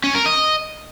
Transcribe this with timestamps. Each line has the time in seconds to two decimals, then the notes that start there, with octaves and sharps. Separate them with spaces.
0.04 C#4
0.15 A#4
0.26 D#5